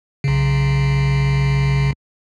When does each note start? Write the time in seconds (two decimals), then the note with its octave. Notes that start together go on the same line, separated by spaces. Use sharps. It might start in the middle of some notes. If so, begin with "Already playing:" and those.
0.24 B1 C#3